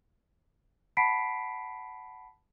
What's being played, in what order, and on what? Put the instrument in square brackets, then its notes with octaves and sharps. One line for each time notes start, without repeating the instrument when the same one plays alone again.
[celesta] F#5 A5 B5 B6 C7 D7